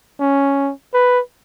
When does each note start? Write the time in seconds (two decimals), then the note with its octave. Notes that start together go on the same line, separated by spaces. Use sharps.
0.20 C#4
0.94 B4